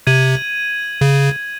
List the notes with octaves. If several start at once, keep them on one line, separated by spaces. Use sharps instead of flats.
C3 G#6 D#7 F#7
C#3